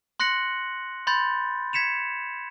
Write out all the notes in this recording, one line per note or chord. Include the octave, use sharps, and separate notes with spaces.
C6 F#6 A#6 C#7 F#7
B5 C6 G6 A6
G#6 B6 C#7 E7 F7